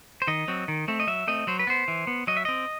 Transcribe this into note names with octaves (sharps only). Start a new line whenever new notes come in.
C5
D#3 D#5
F#3 C4
D#3
A3 C4
D#5
F#3 E5
A3 C4 D#5
F#3 C5
B4
B3 C5
E3
B3
F#3 D#5
E5
C4 D#5